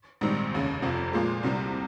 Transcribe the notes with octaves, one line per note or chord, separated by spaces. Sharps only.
A#1 G#2 D#3 G3 C4
F1 D#2 C#3
F1 F2 C3 F3
A#2 F3 G#3
C2 C3 G3